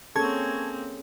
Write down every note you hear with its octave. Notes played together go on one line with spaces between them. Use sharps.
A#3 C4 C#4 G#4 A4 A5 C#6 G#6